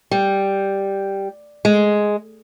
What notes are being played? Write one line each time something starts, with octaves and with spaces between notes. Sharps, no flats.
G3
G#3